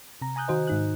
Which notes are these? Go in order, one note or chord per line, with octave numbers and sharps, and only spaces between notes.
C3 A#5
G#5 A#5 D#6 F#6 G6
D#3 F#4 C5 D#5
G#2 D#4 F#6